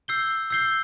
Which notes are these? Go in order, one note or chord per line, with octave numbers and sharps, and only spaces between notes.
E6 G6 C7 G7
E6 G6 C7 G7